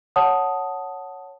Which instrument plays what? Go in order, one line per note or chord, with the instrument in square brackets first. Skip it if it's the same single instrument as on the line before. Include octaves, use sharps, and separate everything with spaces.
[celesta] C#5 F#5 A5 D#6